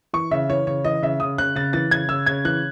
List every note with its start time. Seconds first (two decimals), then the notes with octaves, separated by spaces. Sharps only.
0.13 E3 C#6
0.31 C#3 E5
0.50 E3 C#5
0.67 C#3 C#5
0.85 E3 D#5
1.02 C#3 E5
1.20 C#3 D#6
1.38 C#3 F#6
1.55 C#3 A6
1.73 E3 A6
1.91 C#3 G#6
2.08 C#3 E6
2.26 C#3 G#6
2.45 E3 F#6